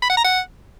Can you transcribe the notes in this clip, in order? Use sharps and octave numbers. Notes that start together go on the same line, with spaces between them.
B5
F#5
A#5
F#5